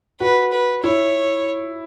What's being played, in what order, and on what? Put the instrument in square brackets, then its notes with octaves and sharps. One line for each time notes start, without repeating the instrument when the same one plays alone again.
[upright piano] F#4 [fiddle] B4
[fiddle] B4
[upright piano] E4 [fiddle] C#5